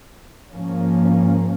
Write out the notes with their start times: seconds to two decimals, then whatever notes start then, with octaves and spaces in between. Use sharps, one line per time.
0.52 G#2 F3 A#3 C#4